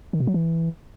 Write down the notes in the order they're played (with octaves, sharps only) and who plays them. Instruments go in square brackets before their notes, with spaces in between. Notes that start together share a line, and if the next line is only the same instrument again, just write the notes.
[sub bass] D#3
B2
F#3
E3